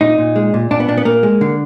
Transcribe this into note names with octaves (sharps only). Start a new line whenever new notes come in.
A#2 D#4
A#2
G#3
A#2
A#2 D4
B3
A#2 D4
B3
A#2 A#3
G#3
D3